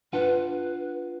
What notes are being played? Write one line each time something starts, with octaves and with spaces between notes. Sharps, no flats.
D4 F4 B4 F#5